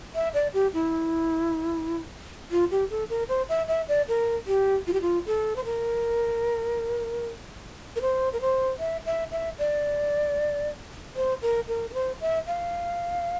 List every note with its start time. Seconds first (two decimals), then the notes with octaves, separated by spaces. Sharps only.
0.15 E5
0.34 D5
0.54 G4
0.74 E4
2.51 F4
2.71 G4
2.90 A4
3.10 A#4
3.29 C5
3.49 E5
3.68 E5
3.88 D5
4.08 A#4
4.47 G4
4.87 F4
4.93 G4
5.01 F4
5.26 A4
5.56 C5
5.65 A#4
7.96 A#4
8.01 C5
8.33 A#4
8.41 C5
8.79 E5
9.06 E5
9.32 E5
9.59 D5
11.16 C5
11.42 A#4
11.68 A#4
11.90 A#4
11.94 C5
12.21 E5
12.47 F5